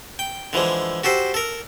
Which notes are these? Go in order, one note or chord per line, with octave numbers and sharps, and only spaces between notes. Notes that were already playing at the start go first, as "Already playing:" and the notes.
G5
D3 E3 F3 G#3
F#4 G4 A4 C5
A4 A#4